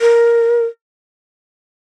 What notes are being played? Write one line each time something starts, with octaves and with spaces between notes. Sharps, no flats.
A#4